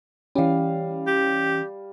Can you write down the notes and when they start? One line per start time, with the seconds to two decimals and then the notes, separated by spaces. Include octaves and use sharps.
0.35 E3 G3 C#4 F5
1.07 G4